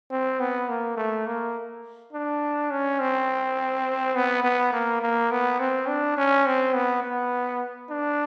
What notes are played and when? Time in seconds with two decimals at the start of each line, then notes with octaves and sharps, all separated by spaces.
0.11 C4
0.40 B3
0.69 A#3
0.97 A3
1.26 A#3
2.13 D4
2.71 C#4
3.00 C4
4.15 B3
4.44 B3
4.73 A#3
5.02 A#3
5.31 B3
5.60 C4
5.88 D4
6.17 C#4
6.46 C4
6.75 B3
7.04 B3
7.90 D4